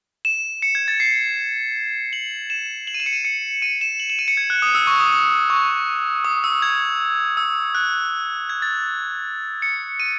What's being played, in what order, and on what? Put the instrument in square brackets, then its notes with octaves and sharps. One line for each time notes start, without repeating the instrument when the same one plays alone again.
[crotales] E7
C#7
G#6
A6
C7
F#7
E7
F#7
D#7
E7
C#7
D#7
C#7
D#7
E7
F#7
E7
D#7
C#7
G#6
F#6
D#6
E6
C#6
D#6
D#6
C#6
D#6
E6
G#6
E6
F#6
G#6
A6
C#7
D#7